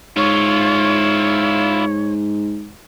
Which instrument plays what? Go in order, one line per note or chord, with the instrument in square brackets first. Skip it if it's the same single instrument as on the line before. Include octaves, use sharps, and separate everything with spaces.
[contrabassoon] G#2 [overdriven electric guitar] E4 F4 [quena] C#5